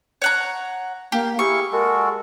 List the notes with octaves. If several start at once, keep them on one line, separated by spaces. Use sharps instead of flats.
C#5 F#5 A#5
A#3 G4 F5
E4 G4 G#4 F5 C#6
G#3 F#4 A4 A#4